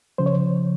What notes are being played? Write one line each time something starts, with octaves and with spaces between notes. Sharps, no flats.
C#3 F3 C5
C#5